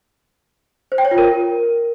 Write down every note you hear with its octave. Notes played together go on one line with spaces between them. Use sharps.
C5
G5
C#5
F4
A#4